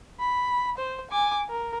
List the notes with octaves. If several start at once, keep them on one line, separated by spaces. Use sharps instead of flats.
B5
C5
G#5 D6
A#4